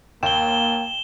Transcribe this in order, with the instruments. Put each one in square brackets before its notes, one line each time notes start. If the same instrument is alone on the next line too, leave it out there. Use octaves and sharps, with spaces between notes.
[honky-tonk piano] D#2 [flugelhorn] A#3 [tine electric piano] G5 [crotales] E7 G7